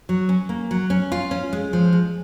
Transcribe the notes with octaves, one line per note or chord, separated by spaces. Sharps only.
F#3
C#4
A#3
F#3
C#4
F4
C#4
G#3
F3
G#3